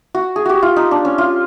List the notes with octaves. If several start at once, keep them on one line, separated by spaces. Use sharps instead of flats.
F#4
G#4
F#4 G4
F4
D#4
D4
C#4
F4